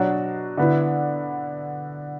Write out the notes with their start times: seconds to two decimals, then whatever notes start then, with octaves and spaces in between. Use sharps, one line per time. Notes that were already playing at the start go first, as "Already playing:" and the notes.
Already playing: B2 F#3 D4 F#4
0.57 D3 B3 E4